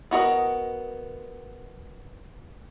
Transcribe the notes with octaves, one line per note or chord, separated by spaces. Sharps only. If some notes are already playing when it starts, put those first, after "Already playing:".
B3 F#4 A#4 D#5